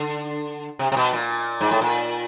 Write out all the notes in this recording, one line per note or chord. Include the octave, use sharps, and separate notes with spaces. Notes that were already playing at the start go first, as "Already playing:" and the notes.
Already playing: D3
C3
C3
B2
A#2
G#2
A2
A#2